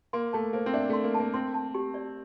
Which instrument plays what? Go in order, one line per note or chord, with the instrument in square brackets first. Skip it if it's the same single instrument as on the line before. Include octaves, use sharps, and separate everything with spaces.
[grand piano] A#3 [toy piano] C6
[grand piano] A3 [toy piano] A5
[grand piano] A#3 [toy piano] C5
[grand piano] C4
[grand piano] D4 [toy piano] E5
[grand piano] A3 [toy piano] C6
[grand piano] A#3
[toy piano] A5
[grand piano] A#3
[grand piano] C4 [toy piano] C6
[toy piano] A5
G4
D5